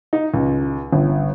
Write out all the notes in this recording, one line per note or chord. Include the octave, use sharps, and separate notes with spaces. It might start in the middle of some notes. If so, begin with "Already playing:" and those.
D#4
C#2
G1